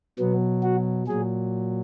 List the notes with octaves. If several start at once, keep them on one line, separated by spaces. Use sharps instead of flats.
B2 F#3 B3
F#4
A#2 F#3 G#4